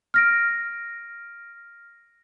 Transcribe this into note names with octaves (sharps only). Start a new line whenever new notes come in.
F6 A#6 D7